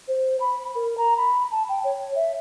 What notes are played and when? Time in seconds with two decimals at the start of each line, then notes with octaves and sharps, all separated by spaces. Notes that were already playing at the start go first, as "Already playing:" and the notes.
0.08 C5
0.40 B5
0.75 A#4
0.98 A#5
1.17 B5
1.52 A5
1.69 G5
1.84 C#5
2.15 E5